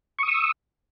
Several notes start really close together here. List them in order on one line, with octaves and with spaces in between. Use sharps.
C#6 D#6 E6